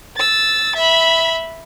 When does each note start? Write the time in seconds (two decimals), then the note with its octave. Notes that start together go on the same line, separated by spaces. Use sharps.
0.16 E6 A6
0.76 E5 B5